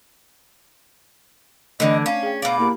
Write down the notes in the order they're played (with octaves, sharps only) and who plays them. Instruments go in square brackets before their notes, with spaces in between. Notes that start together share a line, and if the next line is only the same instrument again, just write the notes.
[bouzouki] D3 E3 [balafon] A3 D4 D5 [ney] D#5
[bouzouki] C#4 [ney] F5
[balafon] G#4 G5
[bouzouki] B2 D5 [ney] F5
[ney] A#3 [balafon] E4 G4